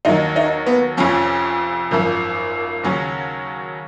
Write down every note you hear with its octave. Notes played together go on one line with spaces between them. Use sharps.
D#2 D#3 F#3 D#4
D#4
B3
F1 F2 F3 C#4
G#1 F#2 F3
D#2 C#3 F#3 C#4